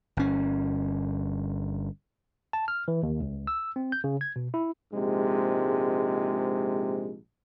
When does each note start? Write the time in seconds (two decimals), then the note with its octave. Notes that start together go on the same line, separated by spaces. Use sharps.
0.17 G1 C#4
2.53 A5
2.68 F6
2.88 E3
3.03 D#2
3.20 C#2
3.47 E6
3.76 C4
3.92 G6
4.04 C#3
4.21 G#6
4.36 B2
4.54 E4
4.92 A#1 G#2 C3 G#3